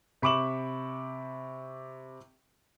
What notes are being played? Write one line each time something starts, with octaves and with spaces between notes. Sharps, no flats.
C3 B5 C#6 D6 E7 F#7